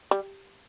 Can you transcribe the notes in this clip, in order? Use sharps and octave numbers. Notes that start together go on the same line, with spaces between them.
G3